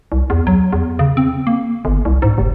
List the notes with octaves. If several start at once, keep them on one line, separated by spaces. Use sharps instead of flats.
C2
E2
F#3
E2
C#3
C4
A#3
G1
C2
G#2
F1